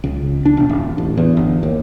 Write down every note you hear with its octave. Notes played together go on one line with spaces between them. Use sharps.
C#2
D4
E1
D#1
A1
E2
G1
D#2